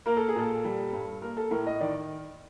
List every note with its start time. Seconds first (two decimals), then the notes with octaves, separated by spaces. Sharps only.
0.06 A#3 A#4
0.17 A4
0.28 G#4
0.36 A#2 A4
0.65 G3
0.93 G2
1.22 A#3 A#4
1.37 A4
1.51 A2 A#4
1.67 D#5
1.80 D#3 D5